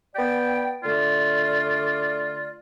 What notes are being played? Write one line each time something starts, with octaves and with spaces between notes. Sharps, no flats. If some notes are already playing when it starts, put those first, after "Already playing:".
B3 D5 G5
D3 A3 F4 D5